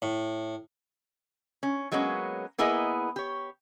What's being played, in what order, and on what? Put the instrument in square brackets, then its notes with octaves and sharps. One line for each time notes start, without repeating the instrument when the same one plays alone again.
[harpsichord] A2
[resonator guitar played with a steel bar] C#4
F#3 G#3 A#3 B3 C#4
A#3 B3 E4 G#4 A#4 D#5
G4 C#5